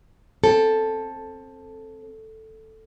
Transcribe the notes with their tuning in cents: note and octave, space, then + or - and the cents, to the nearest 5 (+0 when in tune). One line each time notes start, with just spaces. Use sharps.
C4 +20 A4 +0